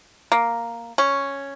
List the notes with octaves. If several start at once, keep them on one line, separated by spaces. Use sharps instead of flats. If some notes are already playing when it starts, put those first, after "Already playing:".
A#3
C#4